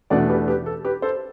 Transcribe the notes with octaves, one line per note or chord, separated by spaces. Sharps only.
E2 B2 A3 D4 D5 F#5
G4 B4
G4 B4
A4
G4 B4
A4 C5